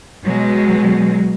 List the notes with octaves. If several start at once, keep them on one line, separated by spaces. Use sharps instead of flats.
B2 F#3 G#3